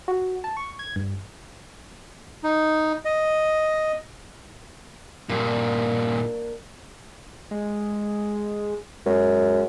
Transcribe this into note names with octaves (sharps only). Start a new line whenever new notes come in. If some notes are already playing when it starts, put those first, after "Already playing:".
F#4
A5
C#6
G#6
G2
D#4
D#5
G2 A#2 A#3 D4
G#3
F#2 G#3